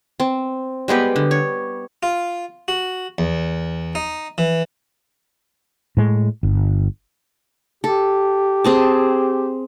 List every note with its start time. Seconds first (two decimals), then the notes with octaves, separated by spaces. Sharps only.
0.20 C4
0.88 G3 G#3 B3 G4
1.16 D3
1.31 C#5
2.03 F4
2.68 F#4
3.18 E2
3.95 D#4
4.38 E3
5.97 A2 G#3
6.43 G1
7.84 G4 A4
8.64 C4 G#4 A5